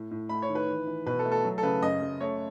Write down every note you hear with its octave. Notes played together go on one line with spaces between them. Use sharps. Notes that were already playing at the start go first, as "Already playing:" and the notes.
Already playing: A2
A2
A3 B5
C#5
D#3
B4
E3
E3
B2 B4
A4
A3
A4
F#3
A4
C#3 B4
F#2 D#5
F#2
A3 C#5